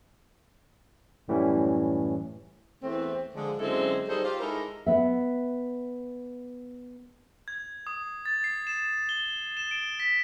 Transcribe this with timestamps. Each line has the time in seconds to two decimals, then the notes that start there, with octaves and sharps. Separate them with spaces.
1.28 F#2 A2 E3 G3 C#4
2.83 E2 E3 A3 C4
3.35 D3 F3 G#3
3.59 F#2 D3 G#3 C4 E4 A4
4.08 G3 D#4 G#4 A4 C5
4.23 F4 G4 C5
4.40 G#3 D#4 E4 A4 A#4
4.86 B3 E5
7.48 G#6
7.87 D#6
8.26 A6
8.44 C7
8.67 E7
9.09 G7
9.57 E7
9.71 D7
10.00 B6